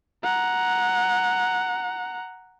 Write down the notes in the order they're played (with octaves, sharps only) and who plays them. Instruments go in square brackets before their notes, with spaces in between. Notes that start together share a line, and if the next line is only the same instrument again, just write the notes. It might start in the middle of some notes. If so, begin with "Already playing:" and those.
[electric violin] F#5 A#5